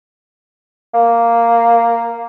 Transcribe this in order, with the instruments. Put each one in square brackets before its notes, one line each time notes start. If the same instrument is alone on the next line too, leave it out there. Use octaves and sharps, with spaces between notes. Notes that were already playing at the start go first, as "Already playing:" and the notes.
[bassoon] A#3